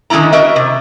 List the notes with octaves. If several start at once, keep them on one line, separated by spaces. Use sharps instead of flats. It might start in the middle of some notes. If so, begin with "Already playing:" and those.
D3 D#3 G#3 D4 E4 A#5
F#4 A#4 D#5 E5
C3